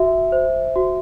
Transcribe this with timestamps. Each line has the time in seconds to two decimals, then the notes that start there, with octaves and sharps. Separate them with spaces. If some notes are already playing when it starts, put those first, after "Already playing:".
Already playing: F#4 E5
0.32 C5
0.76 F#4